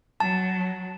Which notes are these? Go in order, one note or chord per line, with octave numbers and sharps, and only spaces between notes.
F#3 A5